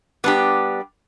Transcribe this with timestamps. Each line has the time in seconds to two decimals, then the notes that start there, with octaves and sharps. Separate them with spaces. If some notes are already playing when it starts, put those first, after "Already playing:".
0.24 G3 B3 D4 G4